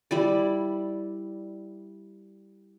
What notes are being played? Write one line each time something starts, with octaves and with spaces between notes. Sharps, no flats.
G3 E4 D5